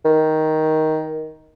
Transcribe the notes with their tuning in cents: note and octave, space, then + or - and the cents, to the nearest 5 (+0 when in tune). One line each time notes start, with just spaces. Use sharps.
D#3 +10